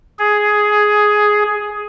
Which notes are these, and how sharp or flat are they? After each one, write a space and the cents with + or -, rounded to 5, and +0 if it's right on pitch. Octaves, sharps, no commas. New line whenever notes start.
G#4 +10